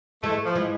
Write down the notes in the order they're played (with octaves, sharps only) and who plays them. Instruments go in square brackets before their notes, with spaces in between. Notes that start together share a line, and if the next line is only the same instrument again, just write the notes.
[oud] E3 G#3 [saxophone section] A3
[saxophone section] F3
[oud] E3 G#3